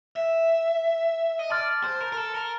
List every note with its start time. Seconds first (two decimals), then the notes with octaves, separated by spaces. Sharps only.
0.16 E5
1.39 D#5
1.50 D5 A5 C6 F6 A6
1.84 C5
2.00 A#4
2.12 A#4
2.17 A4
2.35 A#4